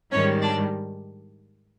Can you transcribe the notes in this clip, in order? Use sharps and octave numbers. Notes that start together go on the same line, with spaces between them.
G#2 D#3 G3 C#4 C#5
D4 D5